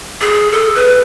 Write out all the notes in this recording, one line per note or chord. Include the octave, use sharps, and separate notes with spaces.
G#4
A4
B4